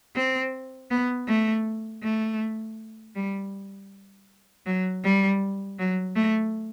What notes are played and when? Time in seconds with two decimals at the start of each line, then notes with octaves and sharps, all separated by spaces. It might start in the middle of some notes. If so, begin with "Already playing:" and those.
0.15 C4
0.90 B3
1.28 A3
2.03 A3
3.16 G3
4.66 F#3
5.04 G3
5.79 F#3
6.16 A3